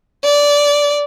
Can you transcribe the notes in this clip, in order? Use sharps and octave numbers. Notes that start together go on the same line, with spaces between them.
D5